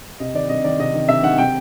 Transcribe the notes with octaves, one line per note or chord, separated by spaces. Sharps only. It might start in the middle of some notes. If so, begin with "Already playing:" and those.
C3 D#5
D#3 D5
C3 D#5
D#3 D5
C3 D#5
D#3
C3 E5
D#3 F#5
C3 G5